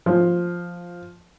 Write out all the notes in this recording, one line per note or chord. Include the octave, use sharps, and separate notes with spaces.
F3